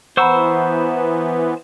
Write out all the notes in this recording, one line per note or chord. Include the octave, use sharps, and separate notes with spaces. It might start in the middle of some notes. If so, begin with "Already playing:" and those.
E3 B3 C5 F#5 A#5 B5 C#6 E6